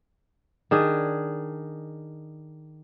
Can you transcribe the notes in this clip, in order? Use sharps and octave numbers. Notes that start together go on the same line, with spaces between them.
D#3 D4 G#4